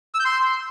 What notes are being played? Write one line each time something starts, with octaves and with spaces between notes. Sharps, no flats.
E6
G6
C6